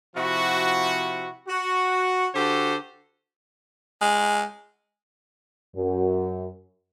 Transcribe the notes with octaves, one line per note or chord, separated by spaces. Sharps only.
C3 F3 E4 F#4
F#4
D3 F#4 G4 A4 C5
G#3
F#2